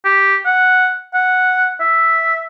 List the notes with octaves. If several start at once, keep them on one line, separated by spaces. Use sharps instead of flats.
G4
F#5
F#5
E5